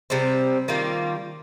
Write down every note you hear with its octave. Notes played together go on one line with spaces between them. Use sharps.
C3 G3 C4
D#3 G3 A#3 F4